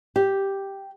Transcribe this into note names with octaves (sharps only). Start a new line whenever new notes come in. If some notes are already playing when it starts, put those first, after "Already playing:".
G4